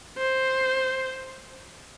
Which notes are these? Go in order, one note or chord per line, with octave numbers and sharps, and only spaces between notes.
C5